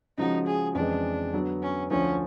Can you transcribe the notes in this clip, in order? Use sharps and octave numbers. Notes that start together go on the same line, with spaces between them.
C#3 F3 G#3 C#4 D#4 F#4
G#4
F2 C#3 E3 G#3 D4
D3 F#3 B3
C#4
D2 D3 F3 C#4